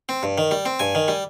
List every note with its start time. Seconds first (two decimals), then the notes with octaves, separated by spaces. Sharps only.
0.09 C4
0.23 G2
0.38 D#3
0.51 G3
0.66 C4
0.79 G2 G#5
0.95 D#3
1.08 G3